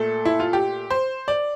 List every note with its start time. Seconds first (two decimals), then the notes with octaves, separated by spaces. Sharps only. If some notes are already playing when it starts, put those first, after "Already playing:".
Already playing: A#2 A3 A4
0.25 E4
0.40 F4
0.53 G4
0.90 C5
1.28 D5